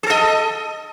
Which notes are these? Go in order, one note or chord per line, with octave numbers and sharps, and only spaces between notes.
G#4 A4 D#5